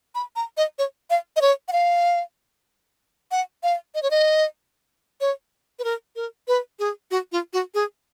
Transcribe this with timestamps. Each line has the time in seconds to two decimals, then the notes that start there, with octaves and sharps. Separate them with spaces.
0.15 B5
0.36 A#5
0.57 D#5
0.79 C#5
1.10 F5
1.36 D#5
1.41 C#5
1.68 F#5
1.73 F5
3.31 F#5
3.63 F5
3.95 D#5
4.03 C#5
4.11 D#5
5.21 C#5
5.79 B4
5.84 A#4
6.16 A#4
6.48 B4
6.79 G#4
7.11 F#4
7.32 F4
7.53 F#4
7.74 G#4